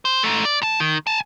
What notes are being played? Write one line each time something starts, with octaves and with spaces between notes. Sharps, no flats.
C5
G#2 A3
D5
F2 A5
D#3
G#5 A5